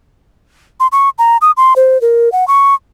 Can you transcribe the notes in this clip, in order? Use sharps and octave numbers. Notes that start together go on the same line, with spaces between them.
C6
C#6
A#5
D#6
C6
C5
A#4
F#5
C#6